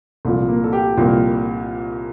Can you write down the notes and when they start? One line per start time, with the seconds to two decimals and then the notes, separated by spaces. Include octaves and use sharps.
0.25 C2 A#2 F3 A3
0.48 A#3
0.64 A4
0.73 G4
0.96 C2 A#2 F3 A#3